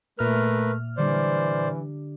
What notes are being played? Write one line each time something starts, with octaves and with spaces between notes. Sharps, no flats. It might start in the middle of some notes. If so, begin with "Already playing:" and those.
A#2 A3 A#4 B4 D5 E5 F6
D3 E3 G3 D4 C5 D5